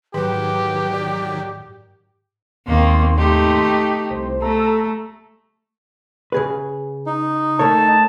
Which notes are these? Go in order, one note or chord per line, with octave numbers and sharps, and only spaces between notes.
G#2 D#3 F#3 G4 B4
D5
D#2 G#2 D#3 A#3 C4 C6
A3 D#4 G4
C2 C5
A3 A4 A#5 E6
C#3 G#4 B4
D#4
A3 A#4 C#5 A5